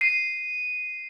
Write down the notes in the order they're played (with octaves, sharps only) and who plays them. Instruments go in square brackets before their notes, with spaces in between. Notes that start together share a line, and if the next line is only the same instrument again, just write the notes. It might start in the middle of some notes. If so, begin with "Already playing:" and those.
[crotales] C7 D#7